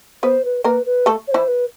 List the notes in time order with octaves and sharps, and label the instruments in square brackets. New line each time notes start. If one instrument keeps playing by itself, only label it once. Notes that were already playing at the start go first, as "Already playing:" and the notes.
[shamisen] B3 B4 [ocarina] C5
[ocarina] B4
[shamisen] A#3 A#4 [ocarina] B4
[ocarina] B4
[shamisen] A3 A4
[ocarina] C#5
[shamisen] E3 E4 [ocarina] C5
[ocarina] B4